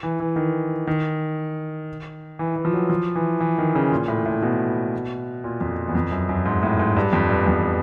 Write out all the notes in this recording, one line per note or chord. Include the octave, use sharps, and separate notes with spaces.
E3
E3
D#3
D#3
E3
E3
F3
F#3
F3
E3
E3
D#3
C#3
A#2
A2
A2
B2
A#2
F2
E2
F2
F#2
F#2
G#2
A2
G#2
G2
F2
G2
E2
F2